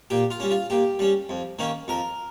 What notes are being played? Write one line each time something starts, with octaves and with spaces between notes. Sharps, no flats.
A#2 G4
F4
G3 C#4
F4
A#2 G4
G3 C#4
F2
D#3 A#3 C#4
F2 A#4